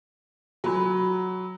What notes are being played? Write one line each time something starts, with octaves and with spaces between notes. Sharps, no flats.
F#3 G#5 B5